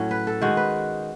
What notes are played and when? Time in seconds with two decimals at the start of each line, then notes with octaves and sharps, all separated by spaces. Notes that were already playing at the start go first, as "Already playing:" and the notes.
Already playing: A2 F#3 C#4 C#5
0.11 B4
0.27 A4
0.41 D#3 G#3 D#4 F#4
0.57 B4